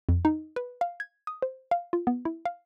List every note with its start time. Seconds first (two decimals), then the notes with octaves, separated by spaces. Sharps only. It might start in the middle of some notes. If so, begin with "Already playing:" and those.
0.09 F2
0.25 D#4
0.56 B4
0.81 F5
1.00 G#6
1.27 D#6
1.42 C5
1.71 F5
1.93 F4
2.07 B3
2.25 E4
2.45 F5